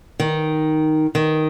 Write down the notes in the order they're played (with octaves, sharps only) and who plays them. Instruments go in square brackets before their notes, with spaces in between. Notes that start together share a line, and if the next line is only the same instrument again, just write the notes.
[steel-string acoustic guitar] D#3
D#3